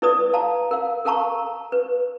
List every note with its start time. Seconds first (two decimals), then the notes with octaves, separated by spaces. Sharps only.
0.02 E4 A4 B4 D5 D#6
0.33 F5 A5 A#5
0.71 A#4 F5
1.05 A4 A#4 F5 A5 A#5 C#6
1.72 B4